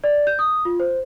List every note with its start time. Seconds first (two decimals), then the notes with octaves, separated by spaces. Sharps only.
0.04 D5
0.27 G6
0.39 D#6
0.65 F4
0.80 C5